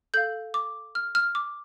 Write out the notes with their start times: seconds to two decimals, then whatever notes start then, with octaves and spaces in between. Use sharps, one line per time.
0.14 A4 F5 G6
0.54 D6
0.95 F6
1.15 F6
1.35 D6